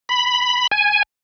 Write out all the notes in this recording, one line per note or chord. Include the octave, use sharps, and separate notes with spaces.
B5
G#5